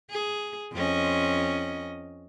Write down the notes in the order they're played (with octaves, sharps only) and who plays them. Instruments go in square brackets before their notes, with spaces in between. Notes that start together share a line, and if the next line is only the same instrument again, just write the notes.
[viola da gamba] G#4
F2 C#4 D#5